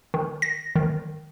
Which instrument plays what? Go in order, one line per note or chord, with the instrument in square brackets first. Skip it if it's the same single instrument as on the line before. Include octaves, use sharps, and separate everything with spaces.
[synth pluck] D#3
A#6
D#3